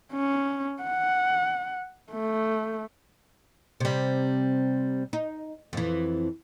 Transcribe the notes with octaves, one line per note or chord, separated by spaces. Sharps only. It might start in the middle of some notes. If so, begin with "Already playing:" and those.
C#4
F#5
A3
C3 G3
D#4
F2 E3